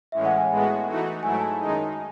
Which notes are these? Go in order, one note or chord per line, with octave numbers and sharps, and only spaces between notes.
A2 E3 G#3 C#4 E5
F#5
G#5
A2 G#3 B3 F#4
E3 A3 D#4 F#4
G#2 F#3 A3 E4 G#5
A5
F#2 D#3 G#3 D#4